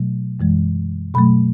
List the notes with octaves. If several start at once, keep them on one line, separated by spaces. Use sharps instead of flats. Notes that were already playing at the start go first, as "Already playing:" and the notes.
Already playing: B2 F#3 A3
F#2 E3 G#3
B2 F#3 A3 B5